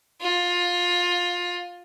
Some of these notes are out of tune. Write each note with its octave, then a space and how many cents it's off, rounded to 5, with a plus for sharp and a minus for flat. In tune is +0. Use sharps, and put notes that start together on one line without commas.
F4 +20